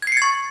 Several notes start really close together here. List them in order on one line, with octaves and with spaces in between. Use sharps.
G#6 C7 C#7 A6 C#6